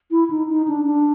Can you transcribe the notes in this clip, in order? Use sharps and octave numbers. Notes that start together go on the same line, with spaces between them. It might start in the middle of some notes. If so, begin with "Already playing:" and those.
E4
D#4
D#4
D4
D4